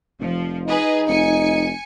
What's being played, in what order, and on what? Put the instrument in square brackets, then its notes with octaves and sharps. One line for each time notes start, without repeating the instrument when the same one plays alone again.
[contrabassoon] F1 [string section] F3
[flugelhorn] D#4 [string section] G#4 B4 D#5
[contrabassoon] F1 [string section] G#5 C#7